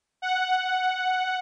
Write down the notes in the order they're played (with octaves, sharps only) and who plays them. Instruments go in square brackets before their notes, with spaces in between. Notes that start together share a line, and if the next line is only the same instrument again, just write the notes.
[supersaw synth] F#5